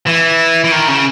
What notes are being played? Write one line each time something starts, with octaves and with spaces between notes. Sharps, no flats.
E3
E3
D#3
C#3